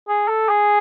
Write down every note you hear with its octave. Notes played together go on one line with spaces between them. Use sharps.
G#4
A4
G#4